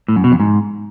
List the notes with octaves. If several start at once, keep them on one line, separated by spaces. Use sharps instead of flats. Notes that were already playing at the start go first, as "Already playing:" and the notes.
A2
F#2
B2
F2
G#2